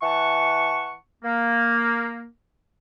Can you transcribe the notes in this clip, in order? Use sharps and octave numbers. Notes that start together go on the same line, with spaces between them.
E3 F#5 A5 C#6
A#3